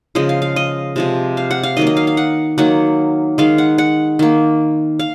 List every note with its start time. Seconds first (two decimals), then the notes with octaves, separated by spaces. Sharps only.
0.15 C#3 F3 G#3 D#5
0.29 F5
0.42 F5
0.56 D#5
0.96 C3 F3 G#3
1.37 F5
1.51 F#5
1.63 F5
1.77 D#3 F#3 A#3 D#5
1.87 D#5
1.97 F5
2.07 F5
2.17 F#5
2.58 D#3 F#3 A#3 F#5
3.38 D#3 G#3 F5
3.58 F#5
3.78 F#5
4.19 D#3 A#3
4.99 F5